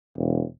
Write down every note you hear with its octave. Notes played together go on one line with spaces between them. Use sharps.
E1